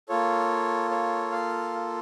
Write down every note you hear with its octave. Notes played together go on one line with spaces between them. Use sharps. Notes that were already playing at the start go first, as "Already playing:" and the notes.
A#3 F4 A4 C#5
C#5
F5